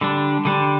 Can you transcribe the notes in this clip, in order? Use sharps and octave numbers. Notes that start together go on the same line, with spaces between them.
D3 G3 D4
D3 G3 D4